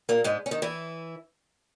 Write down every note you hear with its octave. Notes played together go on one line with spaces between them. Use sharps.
A#2 A#3
G#2 G#3
C#4
D#3 D#4
E3 E4